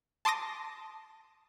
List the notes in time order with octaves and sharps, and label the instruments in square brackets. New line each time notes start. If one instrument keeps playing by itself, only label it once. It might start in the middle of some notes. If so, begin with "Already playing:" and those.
[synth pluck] A5 C6 D6 D#6 A#6